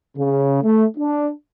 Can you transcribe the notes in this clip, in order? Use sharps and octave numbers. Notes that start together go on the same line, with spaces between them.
C#3
A3
D4